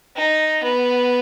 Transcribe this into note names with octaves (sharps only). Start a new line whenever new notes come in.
D#4
B3